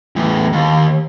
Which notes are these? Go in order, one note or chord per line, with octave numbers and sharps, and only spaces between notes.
E2 A2
D#2